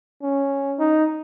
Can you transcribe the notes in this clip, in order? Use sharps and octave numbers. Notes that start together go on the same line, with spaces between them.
C#4
D#4